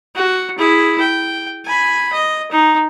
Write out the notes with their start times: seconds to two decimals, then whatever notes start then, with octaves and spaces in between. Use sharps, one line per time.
0.15 F#4
0.58 E4 G#4
1.00 G5
1.65 G#5 B5
2.13 D#5
2.51 D#4